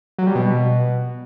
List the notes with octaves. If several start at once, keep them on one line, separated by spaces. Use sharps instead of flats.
F#3
G3
B2